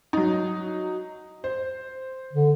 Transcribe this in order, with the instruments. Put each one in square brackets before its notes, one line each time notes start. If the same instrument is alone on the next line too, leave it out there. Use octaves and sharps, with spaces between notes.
[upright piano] F#3 D#4
C5
[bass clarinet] D3